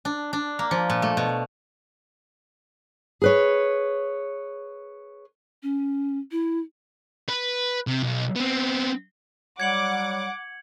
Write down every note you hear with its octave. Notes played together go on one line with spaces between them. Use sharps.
D4
D4
A#3
F3
A#2
A3
B2
G#4 B4 C#5
C#4
E4
B4
C3
B1
B3 C4
F#3 G3 F#5 D6 G#6 C#7 F#7